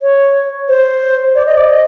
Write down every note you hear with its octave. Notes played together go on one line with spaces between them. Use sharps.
C#5
C5
D5
D#5
D5
D#5